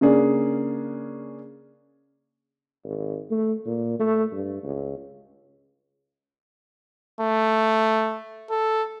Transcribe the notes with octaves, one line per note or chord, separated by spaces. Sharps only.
C#3 A#3 C#4 D4 G#4
G#1
A3
A#2
A3
G2
C#2
A3
A4